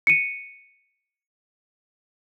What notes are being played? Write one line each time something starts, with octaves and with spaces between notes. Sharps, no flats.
C#7 D#7